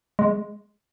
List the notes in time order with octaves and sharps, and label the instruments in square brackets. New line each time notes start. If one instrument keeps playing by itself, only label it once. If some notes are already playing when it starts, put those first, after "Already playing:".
[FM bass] G#3